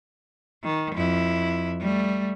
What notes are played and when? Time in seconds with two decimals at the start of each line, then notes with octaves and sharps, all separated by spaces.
0.64 D#3
0.95 F2 E4
1.81 G3 A3